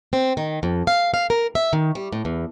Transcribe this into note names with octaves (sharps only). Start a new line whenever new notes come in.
C4
D#3
F2
F5
F5
A#4
E5
D#3
G3
A2
E2